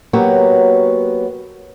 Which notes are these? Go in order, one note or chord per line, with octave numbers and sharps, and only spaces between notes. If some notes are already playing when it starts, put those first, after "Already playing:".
F#3 A#3 B3 F#4 G4 C#5